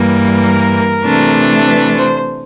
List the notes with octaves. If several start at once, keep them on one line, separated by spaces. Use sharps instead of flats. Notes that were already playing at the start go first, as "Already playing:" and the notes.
Already playing: G2 E3 G3 A#3
A#4
C3 E3 A3 D4
B4
C5